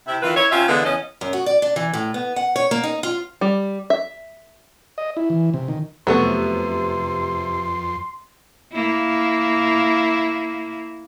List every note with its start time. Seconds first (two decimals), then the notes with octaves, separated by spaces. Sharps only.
0.07 C3 E4
0.22 D#3 E3 F4 B4
0.36 E4 C#5
0.51 C3 C#4 F4 E5
0.68 D3 E3 G#3 B3 E4
0.85 E2 C#3 C#4 D#5
1.21 F#2
1.33 F#4
1.46 D5
1.62 D4
1.76 E3
1.94 A2
2.14 B3
2.36 F#5
2.56 C#5
2.71 A#3
2.83 D#4
3.03 F4
3.41 G3
3.90 E5
4.98 D#5
5.17 E4
5.30 E3
5.54 C3
5.68 D#3
6.07 F2 C3 F#3 A3 B3 C6
8.72 A#3 E4